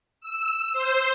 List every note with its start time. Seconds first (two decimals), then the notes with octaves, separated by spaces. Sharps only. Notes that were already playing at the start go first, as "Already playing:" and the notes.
0.21 E6
0.73 C5